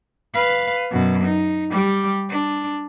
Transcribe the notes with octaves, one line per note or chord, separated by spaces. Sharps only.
B4 F5
F#2 B2
D#4
G3 G4
D4